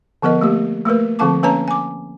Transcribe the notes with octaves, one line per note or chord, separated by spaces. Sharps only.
D3 F3 B3 A#4 D#5
A3 A#3 G4
A3 A#3 A#4 B4
D3 F3 C4 F5 A5 D6
A#3 C#4 B4 C#5 A5 A#5
G#5 D6